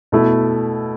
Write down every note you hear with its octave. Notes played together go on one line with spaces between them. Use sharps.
B2 A3 E4